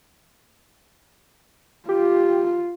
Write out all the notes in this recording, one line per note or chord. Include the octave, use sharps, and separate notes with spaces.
F4 G4